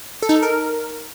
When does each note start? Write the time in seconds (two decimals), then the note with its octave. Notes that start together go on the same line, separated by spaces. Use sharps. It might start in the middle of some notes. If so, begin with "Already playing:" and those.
0.23 A4
0.29 D#4
0.36 A4
0.43 A#4